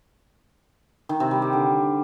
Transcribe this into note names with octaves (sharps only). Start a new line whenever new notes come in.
D#3
C3
G3
G3
D3